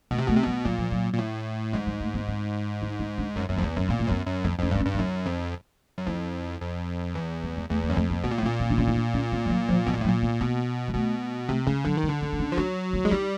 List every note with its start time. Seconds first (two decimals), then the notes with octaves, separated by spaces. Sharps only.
0.11 B2 A3
0.19 C3
0.27 B2 A3
0.36 C3
0.44 B2 G3
0.65 A#2 F#3
0.78 F3
0.92 F#3
1.13 A#2
1.19 A2
1.73 G#2 G3
1.86 G3
2.00 A3
2.14 B3
2.28 C4
2.82 D#4
2.99 D#4
3.18 D4
3.36 F#2 C#4
3.49 F#2 B3
3.57 F2 C4
3.63 E2 B3
3.76 F#2 C4
3.88 A#2 B3
3.99 A#3
4.08 F#2 B3
4.26 F#2
4.44 F2 C4
4.58 F2 C#4
4.71 G2 D4
4.80 C#4
4.85 G2
4.94 D4
4.99 F#2 D#4
5.26 F2
5.98 F#2
6.07 F2 E4
6.61 F2
7.15 E2
7.43 G3
7.56 G#3
7.69 E2 A3
7.83 A#3
7.89 F#2
7.96 F2 A3
8.10 A#3
8.24 B2 B3
8.31 A#2
8.38 A2
8.42 C4
8.46 A#2
8.60 C4
8.70 D4
8.78 C#4
8.87 D#4
8.96 D4
9.14 C#4
9.32 C4
9.45 G3
9.50 F#3
9.69 F3
9.86 B2 F#3
9.94 A#2
9.97 G3
10.01 A2
10.04 F#3
10.09 A#2
10.22 B3
10.41 B2 A#3
10.88 G#3
10.94 B2 A3
11.49 C3 A3
11.67 C#3 G#3
11.85 D3 F#3
11.97 D#3
12.03 G3
12.09 D3
12.21 C4
12.33 C4
12.39 C#4
12.52 F3
12.57 F#3 D4
12.93 E4
13.04 G#3 E4
13.11 G3 D#4